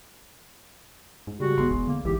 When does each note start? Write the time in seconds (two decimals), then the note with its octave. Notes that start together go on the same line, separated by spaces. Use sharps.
1.27 G#2
1.40 C#3 G3 G#3 F#4
1.58 G#1 E2 G#3 C6
1.70 F1 B1
1.87 D3 A#3
2.05 A1 G#2 E3 G4